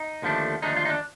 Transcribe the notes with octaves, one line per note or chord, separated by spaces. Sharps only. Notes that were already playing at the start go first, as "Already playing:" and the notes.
Already playing: D#4
D#2 D3 F3 A3 D4
D#2 D3 F3 A3 D4 D#4
F4
D#4
D4